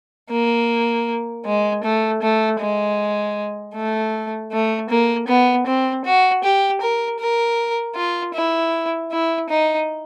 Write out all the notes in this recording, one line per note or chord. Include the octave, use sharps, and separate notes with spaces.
A#3
G#3
A3
A3
G#3
A3
A3
A#3
B3
C4
F#4
G4
A#4
A#4
F4
E4
E4
D#4